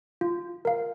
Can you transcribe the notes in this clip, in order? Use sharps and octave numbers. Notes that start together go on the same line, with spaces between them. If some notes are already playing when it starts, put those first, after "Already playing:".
F4
A#4 F5